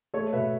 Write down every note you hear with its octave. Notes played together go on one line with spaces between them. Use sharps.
A3 A4 C#5
B2 B4 E5